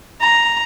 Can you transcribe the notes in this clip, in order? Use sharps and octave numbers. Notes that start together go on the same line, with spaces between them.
A#5